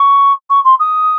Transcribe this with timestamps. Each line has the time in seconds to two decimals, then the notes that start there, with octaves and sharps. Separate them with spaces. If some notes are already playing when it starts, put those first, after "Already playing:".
Already playing: C#6
0.50 C#6
0.65 C6
0.80 D#6